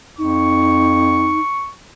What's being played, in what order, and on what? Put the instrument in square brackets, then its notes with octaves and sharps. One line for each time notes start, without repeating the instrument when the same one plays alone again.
[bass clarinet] F2 [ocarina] D#4 [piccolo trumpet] C#6